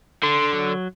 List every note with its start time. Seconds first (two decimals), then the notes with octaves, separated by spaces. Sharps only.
0.23 D3 C6
0.53 F#3